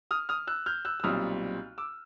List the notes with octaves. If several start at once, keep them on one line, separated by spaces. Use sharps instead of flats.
D#6 F6
D#6 F6
E6 F#6
F6 G6
E6 F#6
E6
B1 A#2 G3 C4 D#6 F6
D6 E6